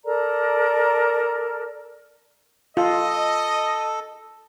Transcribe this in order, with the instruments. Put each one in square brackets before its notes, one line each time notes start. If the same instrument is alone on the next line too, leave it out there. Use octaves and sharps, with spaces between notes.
[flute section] A4 A#4 D5 A#5
[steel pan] F4 [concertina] A4 [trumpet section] D#5